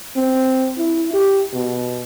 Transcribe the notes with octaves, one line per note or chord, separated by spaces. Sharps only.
C4
E4
G4
B2